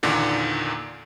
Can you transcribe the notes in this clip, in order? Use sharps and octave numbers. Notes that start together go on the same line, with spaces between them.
E2 A#2 D3 D#3